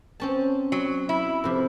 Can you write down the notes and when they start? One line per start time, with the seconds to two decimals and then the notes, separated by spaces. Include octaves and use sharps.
0.20 C4 C#4 A5
0.72 F#3
1.09 E4
1.44 F2 C3